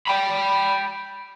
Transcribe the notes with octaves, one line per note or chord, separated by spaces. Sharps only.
G5 B5